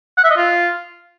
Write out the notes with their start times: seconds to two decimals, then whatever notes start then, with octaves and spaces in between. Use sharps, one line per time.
0.17 F#5
0.24 E5
0.30 D#5
0.36 F4